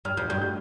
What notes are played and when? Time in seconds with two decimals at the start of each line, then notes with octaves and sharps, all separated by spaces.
0.05 G2 F6
0.17 F2 G6
0.30 G2 G6
0.41 G6